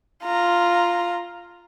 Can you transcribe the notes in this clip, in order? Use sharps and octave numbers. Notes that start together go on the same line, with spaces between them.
F4 A#5